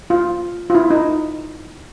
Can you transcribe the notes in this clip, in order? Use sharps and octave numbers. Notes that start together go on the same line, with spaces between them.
F4
F4
E4
D#4